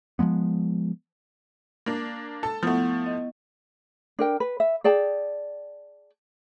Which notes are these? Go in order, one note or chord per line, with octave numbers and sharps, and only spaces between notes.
F3 F#3 G#3 B3
A#3 D4
A4 A5
F3 A3 B3 E4 F#5
D#5
D4 A#4 G5
B4
E5
G#4 D5 G5 A5